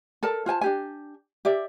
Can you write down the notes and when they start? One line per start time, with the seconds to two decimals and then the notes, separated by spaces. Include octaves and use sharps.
0.23 A4 A#4 D5 A5
0.46 F4 C5 G#5 A5
0.61 D4 G4 G#5
1.45 G4 D5 E5